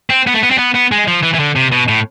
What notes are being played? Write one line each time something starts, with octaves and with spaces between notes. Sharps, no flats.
C4
B3
A3
B3
C4
B3
B3
G#3
F3
E3
E3
D3
C3
B2
A2